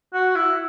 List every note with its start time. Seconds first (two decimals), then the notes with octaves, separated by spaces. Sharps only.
0.13 F#4
0.35 E4